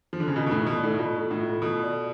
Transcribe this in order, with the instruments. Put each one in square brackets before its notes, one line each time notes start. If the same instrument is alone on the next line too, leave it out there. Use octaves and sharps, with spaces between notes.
[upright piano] F3
D3
C#3
[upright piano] B2 [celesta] F4
[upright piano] B2
A2
[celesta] A4
[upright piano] B2
[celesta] D5
[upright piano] A2
[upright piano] B2 [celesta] F4
[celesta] A4
[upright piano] A2
[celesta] F4
[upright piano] B2 [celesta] A4
[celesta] D5